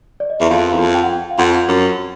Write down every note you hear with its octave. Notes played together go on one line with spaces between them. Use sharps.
D5
D#5
E2 E5
F2 F5
E2
F2
G5
F#5
G5
F5
F2 F#5
F#2